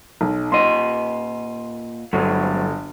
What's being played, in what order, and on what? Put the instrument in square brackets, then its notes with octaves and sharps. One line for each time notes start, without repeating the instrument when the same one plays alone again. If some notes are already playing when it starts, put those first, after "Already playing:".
[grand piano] B1
[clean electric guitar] A#2 D#5 [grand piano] C6
[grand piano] G1 [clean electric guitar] C#2 D3 F#3